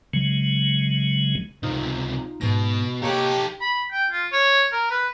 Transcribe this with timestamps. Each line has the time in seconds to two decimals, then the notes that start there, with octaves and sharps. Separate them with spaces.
0.13 C#3 F#3 G#3
1.63 C#2 C3 D#4 F4
2.41 G#2 B2 A#6
3.02 A#3 D#4 G4 A4 C#5 F#6
3.61 B5
3.92 G5
4.11 F4
4.33 C#5
4.72 A#4
4.90 B4